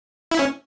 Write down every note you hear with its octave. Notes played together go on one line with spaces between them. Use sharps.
E4
C#4